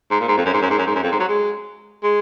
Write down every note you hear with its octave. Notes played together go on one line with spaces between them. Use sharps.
G#2
A#2
G#2
F2
F#2
G#2
F#2
G#2
F#2
G#2
F#2
F2
G#2
F#3
G#3
G#3